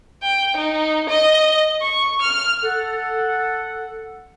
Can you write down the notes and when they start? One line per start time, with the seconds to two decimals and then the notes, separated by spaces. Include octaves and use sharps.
0.22 G5
0.56 D#4
1.09 D#5
1.82 C#6
2.22 F6
2.64 A4 F#5